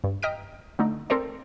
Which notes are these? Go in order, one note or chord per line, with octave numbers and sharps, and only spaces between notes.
G2
D#5 G5 A#5 F6 B6 D7
D3 A3 D#4
C4 A4 A#4 C5 D5